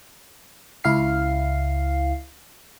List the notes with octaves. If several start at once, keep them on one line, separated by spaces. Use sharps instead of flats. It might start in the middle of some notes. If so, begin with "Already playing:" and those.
C#2 E4 F5 C7